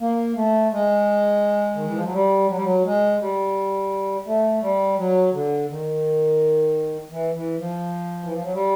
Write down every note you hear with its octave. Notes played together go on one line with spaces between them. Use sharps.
A#3
A3
G#3
D#3
E3
F3
F#3
G3
F#3
G3
F#3
G#3
G3
A3
G3
F#3
D3
D#3
E3
E3
F3
E3
F3
F#3
G3